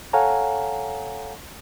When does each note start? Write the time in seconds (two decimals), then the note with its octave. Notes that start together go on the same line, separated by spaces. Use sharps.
0.13 A4 C#5 F5 F#5 G#5 A#5